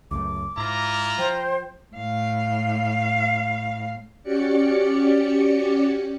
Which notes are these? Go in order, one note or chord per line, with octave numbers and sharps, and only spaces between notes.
C#2 F#2 A3 D6
G#2 E4 F4 A#5
F3 C5 G5
A2 F5
C#4 F#4 G4 D5 C#7